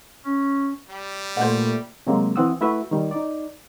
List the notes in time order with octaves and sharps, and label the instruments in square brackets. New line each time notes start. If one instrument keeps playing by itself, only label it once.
[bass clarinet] C#4
[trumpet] G3
[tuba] A#2 [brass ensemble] A3 [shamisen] C5 D5 F#5
[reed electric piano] C3 F#3 G#3 A#3 C4
E3 C4 F#5 D#6 E6
A3 E4 F#4 B4 E5
D#3 G3
D#4 D5